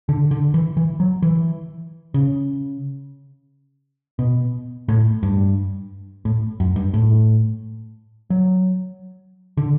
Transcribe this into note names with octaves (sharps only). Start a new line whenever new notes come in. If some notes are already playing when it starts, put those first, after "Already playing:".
D3
D3
E3
E3
F#3
E3
C#3
B2
A2
G2
A2
F#2
G2
A2
F#3
D3